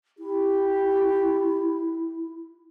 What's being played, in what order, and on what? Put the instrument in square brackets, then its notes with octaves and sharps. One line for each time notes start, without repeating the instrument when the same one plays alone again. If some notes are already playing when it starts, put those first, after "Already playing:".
[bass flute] E4 [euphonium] G4